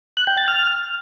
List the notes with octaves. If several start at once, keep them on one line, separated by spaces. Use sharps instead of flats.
F#6
G5
A6
F6